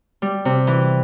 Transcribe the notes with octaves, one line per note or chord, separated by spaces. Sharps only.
G3
C3
E3